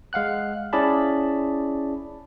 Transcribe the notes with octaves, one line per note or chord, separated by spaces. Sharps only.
G#3 F5 F#5 F#6
C#4 E4 G#4 D5 A5 B5